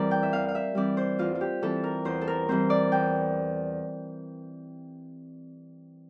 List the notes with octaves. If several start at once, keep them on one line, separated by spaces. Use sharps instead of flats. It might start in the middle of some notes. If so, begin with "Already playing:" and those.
Already playing: E2 E3 G3 C4 A#4 C5 D5
G5
E5
E2 F5
F5
E5
E3 G3 C4 D5
C5
E2 F4
F4
G4
E3 G3 C4 A4
A#4
E2 C5
A4
A#4
E3 G3 C4 C5
D5
E2 G5